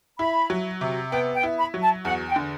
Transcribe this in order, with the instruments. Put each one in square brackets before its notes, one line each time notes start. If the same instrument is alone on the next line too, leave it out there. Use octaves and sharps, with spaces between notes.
[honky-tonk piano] E4 [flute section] B5
[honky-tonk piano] F#3
C3
[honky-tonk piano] B3 [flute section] G5
[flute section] G5
[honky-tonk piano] E4
[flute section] B5
[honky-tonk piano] F#3
[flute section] A5
[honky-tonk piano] E2 [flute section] F#5
[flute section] G5
[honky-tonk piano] D3